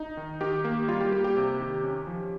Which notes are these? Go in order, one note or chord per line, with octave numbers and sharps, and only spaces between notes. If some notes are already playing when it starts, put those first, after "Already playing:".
Already playing: D#4
D#3
D#3 G4
A#3
G3 F4
G4
A#3 G4
G4
C3
D#3
C#4
F3